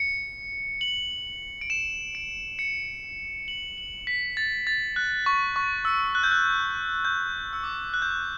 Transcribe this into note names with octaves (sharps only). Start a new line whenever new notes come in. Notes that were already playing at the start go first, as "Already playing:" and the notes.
Already playing: C#7
F#7
D7
E7
D7
C#7
F#7
F#7
B6
A6
A6
F#6
C#6
C#6
E6
F#6
G6
F#6
G6
E6
D6
F#6
G6
F#6